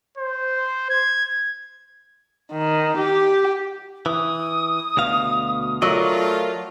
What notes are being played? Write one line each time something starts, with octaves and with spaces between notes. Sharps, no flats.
C5
G#6
D#3
G4
E3 D#6
D2 B2 F5
F#3 A3 F4 A#4 D5 D#5